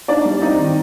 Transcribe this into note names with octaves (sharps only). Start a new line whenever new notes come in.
D4 D#4 D5
G3
C4 D#4 D#5
D#3